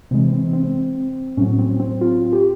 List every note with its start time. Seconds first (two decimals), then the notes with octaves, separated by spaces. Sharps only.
0.11 C3 E3 G#3 C4
0.32 C4
0.53 C4
1.37 A2 F#3 C#4
1.59 C4
1.80 C4
2.01 F4
2.33 G4